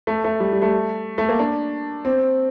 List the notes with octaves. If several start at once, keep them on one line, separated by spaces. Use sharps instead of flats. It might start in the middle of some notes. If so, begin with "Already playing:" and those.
A3
A3
G3
G3
A3
A3
A#3
D4
C4